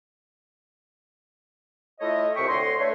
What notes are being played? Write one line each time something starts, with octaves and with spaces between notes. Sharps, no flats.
A3 E4 F4 C#5 D#5
C2 E5 G5 C#6
D2 D3 C#5 D#5 C6
A3 D4 A4 B4 C#5